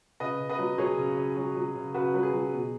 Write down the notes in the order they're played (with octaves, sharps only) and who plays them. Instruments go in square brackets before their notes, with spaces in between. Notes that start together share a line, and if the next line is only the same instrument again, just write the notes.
[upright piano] C#3 B4 D#5
C#3
B4 D#5
F#3
F#3 G#4 C#5
C#3
C#3
F#3
F#3
C#3
C#3 F#4 B4
F#3 B4
G#4
F#3
B2